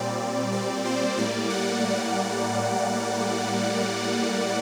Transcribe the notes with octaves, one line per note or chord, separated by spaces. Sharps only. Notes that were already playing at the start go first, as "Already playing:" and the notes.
Already playing: A#2 G3 C4 D5
D5
C5
A2 G3 A#3 D5
F#5